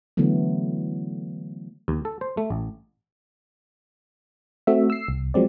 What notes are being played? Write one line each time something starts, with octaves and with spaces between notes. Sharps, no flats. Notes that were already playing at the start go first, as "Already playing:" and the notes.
D3 E3 F#3 A3 B3
D#2
A4
C5
A3
A1
A3 C4 F#4 E5
E6 C7
C2
F3 F#3 G#3 C4 D5